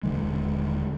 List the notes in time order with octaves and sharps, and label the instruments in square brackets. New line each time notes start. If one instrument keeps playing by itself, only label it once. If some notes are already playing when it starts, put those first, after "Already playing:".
[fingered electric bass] D#1 D#2 D3 G#3